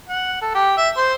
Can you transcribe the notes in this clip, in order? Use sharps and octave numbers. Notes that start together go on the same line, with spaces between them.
F#5
A4
G4
E5
C5